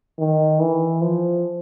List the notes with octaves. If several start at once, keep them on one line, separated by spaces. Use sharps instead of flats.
D#3
E3
F3